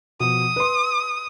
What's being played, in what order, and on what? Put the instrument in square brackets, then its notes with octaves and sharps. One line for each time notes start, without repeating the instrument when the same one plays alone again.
[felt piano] B2 F3 [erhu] D#6
[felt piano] B4 C6